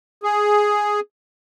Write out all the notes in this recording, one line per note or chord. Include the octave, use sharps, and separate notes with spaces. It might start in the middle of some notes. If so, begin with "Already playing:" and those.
G#4